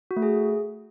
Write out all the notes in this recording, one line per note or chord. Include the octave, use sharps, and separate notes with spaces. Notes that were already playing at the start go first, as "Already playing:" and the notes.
F#4
A3
G#4